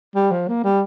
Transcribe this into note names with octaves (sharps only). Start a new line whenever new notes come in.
G3
F3
A#3
G3